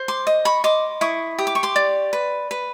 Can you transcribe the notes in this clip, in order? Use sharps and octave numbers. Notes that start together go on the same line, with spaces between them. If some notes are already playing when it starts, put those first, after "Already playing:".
Already playing: C5
C6 D6
D#5
B5 C#6
D#5 C6 D6
E4 C#6 D#6
G4 D#6
D6
C#6
C6 D6
D5
B4
B4